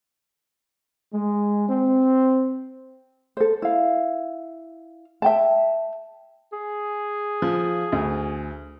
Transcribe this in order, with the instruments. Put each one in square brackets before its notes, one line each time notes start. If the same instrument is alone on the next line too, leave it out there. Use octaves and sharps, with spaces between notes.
[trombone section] G#3
C4
[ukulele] A4 C5
E4 F5
E5 G5 A5
[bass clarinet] G#4
[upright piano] F3
D2